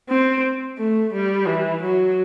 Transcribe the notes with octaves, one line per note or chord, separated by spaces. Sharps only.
C4
A3
G3
E3
F#3